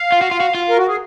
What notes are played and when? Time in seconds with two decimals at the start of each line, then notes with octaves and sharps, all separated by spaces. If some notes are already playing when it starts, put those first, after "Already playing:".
Already playing: F5
0.12 F4
0.21 F#4
0.31 F4
0.40 F#4
0.55 F4
0.69 A#4
0.78 F#4
0.88 G#4